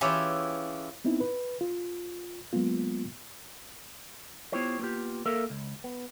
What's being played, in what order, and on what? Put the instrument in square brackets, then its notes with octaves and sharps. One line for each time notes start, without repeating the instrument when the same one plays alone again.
[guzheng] E3 C#4 E4 F4 G4 G#4
[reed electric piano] B3 C4 D#4 E4
B4
F4
F#3 G#3 A#3 B3 F4
[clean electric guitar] B3 E4 F4 G4 C5 C#5
A#3 B3 D#4 F4 G4
A#3 A4 A#4 E5 F5
C#2
B3